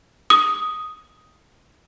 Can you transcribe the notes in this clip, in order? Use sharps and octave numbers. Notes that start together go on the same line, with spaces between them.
D#6